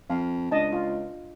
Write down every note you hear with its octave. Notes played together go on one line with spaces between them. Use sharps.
F2 F5
C#2 D4 D#5 A5
F4